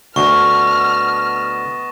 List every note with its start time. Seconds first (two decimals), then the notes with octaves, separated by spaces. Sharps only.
0.16 D2 B3 D#5 A5 C#6 F6